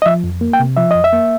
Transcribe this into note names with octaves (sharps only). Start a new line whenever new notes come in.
D#5
F3 E5
F2
A#3
G5
C3
F3 E5
F2 D#5
E5
A#3